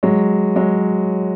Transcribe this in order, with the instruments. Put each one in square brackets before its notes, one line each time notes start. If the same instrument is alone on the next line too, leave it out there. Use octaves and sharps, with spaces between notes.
[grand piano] F#3 G#3
F#3 G#3